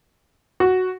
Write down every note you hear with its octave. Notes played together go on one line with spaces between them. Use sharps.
F#4